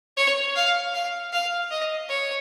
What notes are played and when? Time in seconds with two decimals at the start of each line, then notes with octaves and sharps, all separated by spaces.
0.17 C#5
0.56 F5
0.94 F5
1.33 F5
1.71 D#5
2.09 C#5